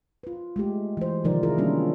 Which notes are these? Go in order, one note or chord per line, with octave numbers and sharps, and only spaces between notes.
F4 B4
G#3 A3 G4
E3 C5
C3 D#3 F3 D#4 A#4 D5
E4 F4 G#4 A#4
G3 A#3 C#4 D4 F4 F#4